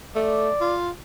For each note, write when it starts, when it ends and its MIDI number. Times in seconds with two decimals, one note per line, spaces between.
0.16 0.50 57
0.16 0.74 74
0.61 0.89 65